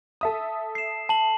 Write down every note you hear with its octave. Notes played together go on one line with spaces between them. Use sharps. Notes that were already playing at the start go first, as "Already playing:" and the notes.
A4 E5 D#6
C7 E7
A5 F#7